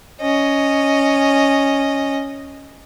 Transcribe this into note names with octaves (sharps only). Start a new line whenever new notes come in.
C#4 D#5